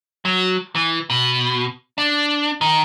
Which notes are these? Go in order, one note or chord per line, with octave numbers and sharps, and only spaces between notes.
F#3
E3
B2
D4
D#3